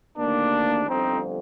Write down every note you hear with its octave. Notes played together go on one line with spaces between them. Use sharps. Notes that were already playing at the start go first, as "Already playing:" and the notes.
D2 C3 D#3 A#3 D4
G1 F2 D3 F3 C4 D#4